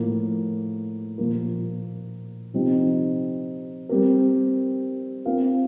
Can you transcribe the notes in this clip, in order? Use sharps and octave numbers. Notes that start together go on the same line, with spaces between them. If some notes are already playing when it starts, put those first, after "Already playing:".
Already playing: A2 F3 A#3
A#2 F3 A#3
C3 F3 C4 D#4
G3 C4 G4 A#4
C4 F4 A#4 F5